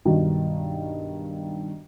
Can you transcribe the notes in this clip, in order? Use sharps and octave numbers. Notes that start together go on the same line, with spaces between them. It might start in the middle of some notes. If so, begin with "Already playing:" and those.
B1 G2 D#3